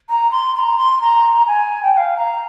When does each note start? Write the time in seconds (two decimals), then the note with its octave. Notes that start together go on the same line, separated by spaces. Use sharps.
0.09 A#5
0.32 C6
0.55 C6
0.59 A#5
0.78 C6
1.01 A#5
1.47 G#5
1.83 G5
1.94 G5
1.97 F5
2.17 A#5